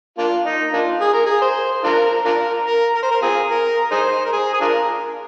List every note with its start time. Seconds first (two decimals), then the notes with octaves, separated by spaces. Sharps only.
0.18 A#3 D4 F4
0.46 D#4
0.73 A#3 D4 F4
1.01 G#4
1.14 A#4
1.26 G#4
1.42 C5
1.84 D4 F4 A#4
2.25 D4 F4 A#4
2.67 A#4
2.95 A#4
3.03 C5
3.11 A#4
3.22 C4 F4 G#4
3.50 A#4
3.91 D#4 G#4 C5
4.25 A#4
4.33 G#4
4.54 G#4
4.61 D4 F4 A#4